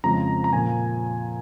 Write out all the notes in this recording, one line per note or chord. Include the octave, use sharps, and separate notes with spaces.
F2 C#3 F3 G#3 A#5
A#5
A#2 F3 G#5